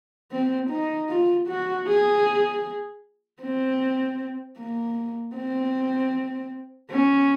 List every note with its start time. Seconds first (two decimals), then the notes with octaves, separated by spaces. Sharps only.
0.32 C4
0.70 D#4
1.10 F4
1.48 F#4
1.88 G#4
3.42 C4
4.58 A#3
5.36 C4
6.91 C#4